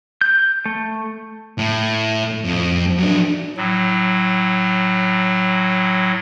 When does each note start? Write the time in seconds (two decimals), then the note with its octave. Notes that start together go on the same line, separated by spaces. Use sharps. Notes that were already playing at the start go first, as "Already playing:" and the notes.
0.21 G6
0.66 A3
1.58 A2
2.45 F2
2.99 F#3 D4
3.57 A2 F#3